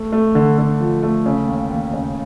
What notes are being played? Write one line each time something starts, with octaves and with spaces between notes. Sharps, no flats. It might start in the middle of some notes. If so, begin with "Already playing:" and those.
Already playing: A3
A3
D3
D3
F3
A3
C#3
D#2
D#2
C#3